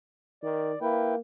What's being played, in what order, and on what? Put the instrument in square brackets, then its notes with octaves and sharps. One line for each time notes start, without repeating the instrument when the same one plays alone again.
[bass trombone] D#3 [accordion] D5
[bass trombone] A#3 [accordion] E4 B4 G5